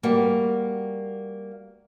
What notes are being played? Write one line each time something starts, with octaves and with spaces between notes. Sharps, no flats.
G3 A#3 F#4